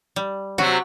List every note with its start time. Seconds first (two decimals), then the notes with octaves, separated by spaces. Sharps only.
0.16 G3
0.58 C3 F#3 F#4